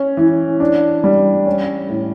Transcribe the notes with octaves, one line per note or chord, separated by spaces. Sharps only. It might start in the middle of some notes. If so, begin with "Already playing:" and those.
Already playing: C#4
E3
D4
G3
C#4
A2